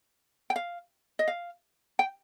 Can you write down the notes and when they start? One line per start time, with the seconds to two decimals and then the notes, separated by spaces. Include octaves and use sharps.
0.50 G5
0.56 F5
1.19 D#5
1.28 F5
1.99 G5